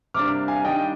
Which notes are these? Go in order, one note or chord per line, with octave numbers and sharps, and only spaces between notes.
C3 G3 A#3 D4 D6 F6
F5 G#5
D#3 G3 D4 D#5 G5